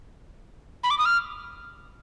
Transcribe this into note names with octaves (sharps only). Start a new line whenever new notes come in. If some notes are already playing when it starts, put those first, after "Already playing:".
B5
D6
D#6
F6